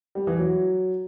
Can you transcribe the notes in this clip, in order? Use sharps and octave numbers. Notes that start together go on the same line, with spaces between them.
G3
E3
F#3